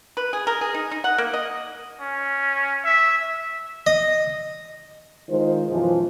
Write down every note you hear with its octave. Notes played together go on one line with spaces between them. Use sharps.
B4
G#4
A#4
G#4
D#4
D#4
F#5
A#3
D#5
C#4
E5
D#5
D#3 G#3 F4 C5
F#2 B2 E3 F3